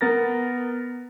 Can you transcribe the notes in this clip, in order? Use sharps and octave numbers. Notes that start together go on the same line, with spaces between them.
B3 A#4 A6 A#6